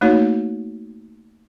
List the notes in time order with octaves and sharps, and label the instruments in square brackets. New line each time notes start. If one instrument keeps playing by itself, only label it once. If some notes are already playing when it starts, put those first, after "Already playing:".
[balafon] A3 A#3 D#4 F#4 C#5